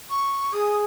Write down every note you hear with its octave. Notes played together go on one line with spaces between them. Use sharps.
C#6
G#4 D#6